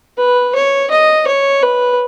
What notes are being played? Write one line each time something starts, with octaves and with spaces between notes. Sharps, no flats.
B4
C#5
D#5
C#5
B4